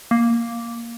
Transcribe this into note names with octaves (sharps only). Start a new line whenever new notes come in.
A#3